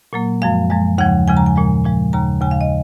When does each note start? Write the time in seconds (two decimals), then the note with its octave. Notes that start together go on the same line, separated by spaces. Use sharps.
0.13 A#2 F#3 A#3
0.42 F#2 F3 G#3 F5
0.70 F#2 F3 G#3
0.98 D#2 C#3 F3 G#3 F#5
1.27 D#2 C#3 F3 G#3 G#5
1.37 A#5
1.46 G#5
1.56 A#2 F3 G#3
1.84 A#2 F3 G#3
2.13 D#2 C#3 G#3 A#5
2.41 D#2 C#3 G#3 G#5
2.51 F5
2.61 D#5